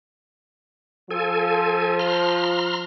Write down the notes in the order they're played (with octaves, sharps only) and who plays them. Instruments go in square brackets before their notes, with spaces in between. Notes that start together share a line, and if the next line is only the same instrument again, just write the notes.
[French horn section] F3 [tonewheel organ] A4 G#5
[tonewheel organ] A#5 C6 F6